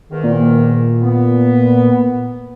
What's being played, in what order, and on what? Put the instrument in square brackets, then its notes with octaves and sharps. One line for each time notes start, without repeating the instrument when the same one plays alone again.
[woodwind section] E2 G#2 D#3
[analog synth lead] A#2
[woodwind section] B3